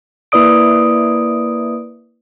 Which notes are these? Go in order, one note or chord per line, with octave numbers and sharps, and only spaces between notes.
A#3 E4 B4 D5 D#6 D7